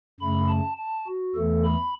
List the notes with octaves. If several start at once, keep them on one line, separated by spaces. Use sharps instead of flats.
F#2 C#3 A3 B5
A5
A5
F#4
E2 E3 A3 A4
B5